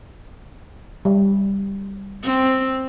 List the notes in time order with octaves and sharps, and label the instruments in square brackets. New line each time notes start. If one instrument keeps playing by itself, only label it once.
[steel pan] G3
[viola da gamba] C4